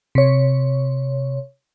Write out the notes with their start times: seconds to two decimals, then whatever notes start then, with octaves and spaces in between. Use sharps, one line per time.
0.15 C3 C#5